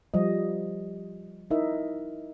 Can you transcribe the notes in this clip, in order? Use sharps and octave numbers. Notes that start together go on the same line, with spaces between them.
F3 G3 D#5
D#4 E4 A#4 D#5 E5